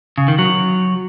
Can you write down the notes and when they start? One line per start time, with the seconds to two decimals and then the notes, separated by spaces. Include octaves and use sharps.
0.18 C#3
0.28 D#3
0.39 F#3